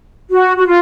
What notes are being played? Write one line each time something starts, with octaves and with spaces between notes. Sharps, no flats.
F#4
F#4
F4